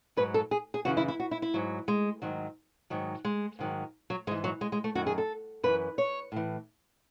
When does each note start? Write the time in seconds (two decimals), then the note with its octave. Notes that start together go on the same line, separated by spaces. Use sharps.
0.17 G#2 F#3 B4
0.34 A4
0.51 G#4
0.74 G#4
0.85 F#2 C#3 E3 F#4
0.97 E4
1.08 E4
1.20 F#4
1.31 E4
1.42 E4
1.54 G#2 F#3
1.88 G#3
2.22 G#2 D#3 F#3
2.90 G#2 D#3 F#3
3.25 G#3
3.59 G#2 D#3 F#3
4.10 F#3
4.27 G#2 G#3
4.31 E3
4.44 F#3
4.61 G#3
4.72 G#3
4.84 A3
4.95 F#2 D#3 F#3 F#4
5.07 G#4
5.18 A4
5.63 F#2 E3 B4
5.98 C#5
6.32 A2 E3